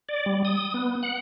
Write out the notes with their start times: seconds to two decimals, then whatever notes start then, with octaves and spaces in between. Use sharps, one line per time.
0.09 D5
0.26 G3
0.45 D#6
0.74 B3
1.03 F#5